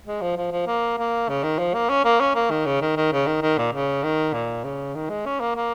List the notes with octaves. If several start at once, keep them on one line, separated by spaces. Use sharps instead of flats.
G#3
F3
F3
F3
A#3
A#3
C#3
D#3
F3
A#3
C#4
A#3
C#4
A#3
D#3
C#3
D#3
D#3
C#3
D#3
D#3
A#2
C#3
D#3
A#2
C#3
D#3
G#3
C#4
A#3
A#3